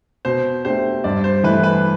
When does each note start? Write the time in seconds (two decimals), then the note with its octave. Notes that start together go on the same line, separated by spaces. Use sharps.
0.25 B2 C5
0.65 A3 D4 G4 C5
1.04 G2 D5
1.24 C5
1.44 E3 A3 B4
1.64 B4